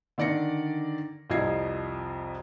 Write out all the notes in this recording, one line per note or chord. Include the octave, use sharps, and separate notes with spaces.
D3 D#3 D5 A#6 C#7
C2 F2 F3 D#5 G#6 C7